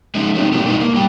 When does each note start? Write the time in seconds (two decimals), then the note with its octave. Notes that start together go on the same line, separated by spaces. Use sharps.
0.15 G#3 C#4 D#4 G#4 E5
0.35 F#3 A3 C4 D#4
0.53 G2 B2 A3 A#3 E4 G4
0.68 G#3 D#4 B4
0.80 A#3
0.93 G#2 G3 G5